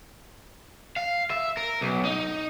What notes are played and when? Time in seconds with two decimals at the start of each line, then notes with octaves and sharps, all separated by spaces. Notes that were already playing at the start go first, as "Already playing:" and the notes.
0.96 F5
1.30 E5
1.57 A#4
1.81 B1
2.05 D#4